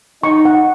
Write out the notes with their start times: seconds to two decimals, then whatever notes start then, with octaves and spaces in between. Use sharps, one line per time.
0.23 D#4 C#6
0.45 F#5